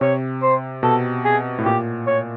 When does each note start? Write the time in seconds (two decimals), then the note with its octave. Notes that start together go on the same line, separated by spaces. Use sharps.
0.01 C3 C#5
0.42 C5
0.83 B2 A4
1.25 G#4
1.59 A2
1.65 A#2 G4
2.07 C#5